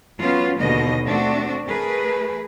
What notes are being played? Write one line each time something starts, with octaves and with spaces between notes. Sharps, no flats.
F#3 B3 C#4 F4
D#2 B2 D3 D#5
A3 C4 D4 F#4
A3 G#4 A#4 B4